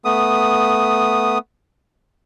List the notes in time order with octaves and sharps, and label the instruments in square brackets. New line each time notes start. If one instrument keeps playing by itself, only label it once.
[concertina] A3 B3 D#6